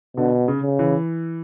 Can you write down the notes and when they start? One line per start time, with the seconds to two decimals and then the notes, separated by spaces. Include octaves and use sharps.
0.17 B2 D3
0.48 C#3
0.63 C#3
0.79 E3